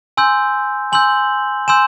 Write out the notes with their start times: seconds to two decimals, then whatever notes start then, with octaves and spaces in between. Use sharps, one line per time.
0.17 G#5 C6 E6 G6
0.92 G#5 C6 E6 G6 F#7
1.68 G#5 C6 E6 G6 E7